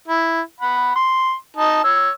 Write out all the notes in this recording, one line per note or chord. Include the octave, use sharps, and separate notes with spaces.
E4
F#5 B5
C6
D#4 A5
C#5 E6